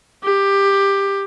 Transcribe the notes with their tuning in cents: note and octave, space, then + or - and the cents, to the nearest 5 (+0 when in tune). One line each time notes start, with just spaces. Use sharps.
G4 +15